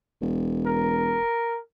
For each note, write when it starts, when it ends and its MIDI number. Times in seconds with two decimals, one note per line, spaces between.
0.21 1.20 28
0.66 1.60 70